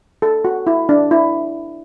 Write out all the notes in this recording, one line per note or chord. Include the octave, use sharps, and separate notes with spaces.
A4
F#4
E4
D4
E4